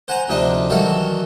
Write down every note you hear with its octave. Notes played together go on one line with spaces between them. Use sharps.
C5 F#5 G#5 A#5 C6
D2 C3 F3 D4 D#4 D#5
D#3 E3 F#3 G3 F#4 A4